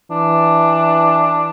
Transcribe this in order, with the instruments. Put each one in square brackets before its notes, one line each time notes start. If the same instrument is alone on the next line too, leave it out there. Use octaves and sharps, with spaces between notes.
[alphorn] E3 [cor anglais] D4